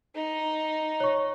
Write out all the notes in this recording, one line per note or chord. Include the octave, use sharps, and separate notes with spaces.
D#4
C#5 C#6